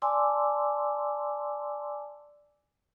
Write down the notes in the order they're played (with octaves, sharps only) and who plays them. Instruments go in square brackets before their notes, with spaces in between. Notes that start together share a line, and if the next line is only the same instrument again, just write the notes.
[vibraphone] D5 G#5 A5 C6 D6 E6